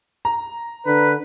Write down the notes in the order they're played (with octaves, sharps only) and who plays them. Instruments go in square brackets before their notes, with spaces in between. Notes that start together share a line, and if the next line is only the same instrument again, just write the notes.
[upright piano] A#5
[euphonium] D3 [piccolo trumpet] B4